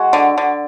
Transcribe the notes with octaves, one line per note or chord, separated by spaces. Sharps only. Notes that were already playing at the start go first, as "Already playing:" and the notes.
Already playing: G#3 F#4
D3
D3